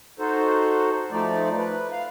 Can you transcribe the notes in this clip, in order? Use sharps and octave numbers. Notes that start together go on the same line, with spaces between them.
D#4 F#4 A4 C5
F3 A3 D#4 D5
B4
F5